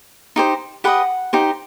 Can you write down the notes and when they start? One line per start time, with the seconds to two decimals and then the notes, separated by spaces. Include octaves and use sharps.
0.36 D#4 G4 C5
0.84 G4 B4 D#5 F#5
1.33 D#4 G4 C5